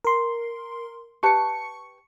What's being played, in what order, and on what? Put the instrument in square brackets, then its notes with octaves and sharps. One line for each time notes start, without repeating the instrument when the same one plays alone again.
[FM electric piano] A#4 C6
[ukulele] G4 B4 A5 [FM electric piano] C#6 C#7